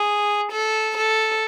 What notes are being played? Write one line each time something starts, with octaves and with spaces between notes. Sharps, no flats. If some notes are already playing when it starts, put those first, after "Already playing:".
Already playing: G#4
A4
A4